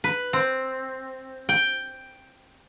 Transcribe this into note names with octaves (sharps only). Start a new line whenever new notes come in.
B4
C4
G5